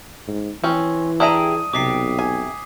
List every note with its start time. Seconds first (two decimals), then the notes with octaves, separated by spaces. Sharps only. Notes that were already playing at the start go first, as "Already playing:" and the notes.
0.28 G#2
0.63 E3 C4 C#4
1.20 D4 E4 G4 G#4 E5 A#5 D#6 D#7
1.73 B1 C3 G4 D6 B6 C7
2.19 G#5